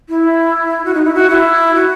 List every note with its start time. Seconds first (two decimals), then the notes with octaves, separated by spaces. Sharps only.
0.09 E4
0.85 F#4
0.94 D#4
1.05 E4
1.15 F#4
1.30 E4
1.75 F#4